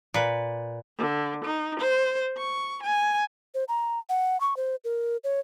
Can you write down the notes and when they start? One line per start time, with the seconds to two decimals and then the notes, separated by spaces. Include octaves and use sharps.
0.14 A#2 B4
0.99 D3
1.45 D#4
1.80 C5
2.38 C#6
2.83 G#5
3.54 C5
3.68 A#5
4.09 F#5
4.40 C#6
4.57 C5
4.84 A#4
5.24 C#5